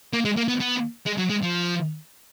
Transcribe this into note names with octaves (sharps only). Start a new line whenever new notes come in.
A#3
G#3
A#3
B3
B3
G#3
F#3
G#3
F3